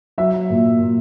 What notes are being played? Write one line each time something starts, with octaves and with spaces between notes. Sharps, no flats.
F#3 E5
A#2
A#2